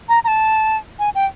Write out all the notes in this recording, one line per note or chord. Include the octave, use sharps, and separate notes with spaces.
A#5
A#5
A5
G#5
G5